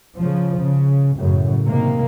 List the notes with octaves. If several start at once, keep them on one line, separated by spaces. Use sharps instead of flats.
C#3 F3
C#3
F#2 A2 C#3
C3 D#3 A#3